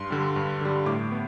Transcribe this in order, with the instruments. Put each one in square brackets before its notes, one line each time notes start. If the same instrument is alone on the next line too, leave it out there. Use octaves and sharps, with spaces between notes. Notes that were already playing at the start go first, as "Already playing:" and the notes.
Already playing: [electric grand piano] G2 C6
D3 G3
G2
D3 G3
A2 D6
B3